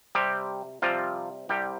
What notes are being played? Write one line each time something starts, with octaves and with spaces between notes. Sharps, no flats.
C3 G3 C4 G4
C3 F3 G3 C4 F4
C2 C3 G3 G4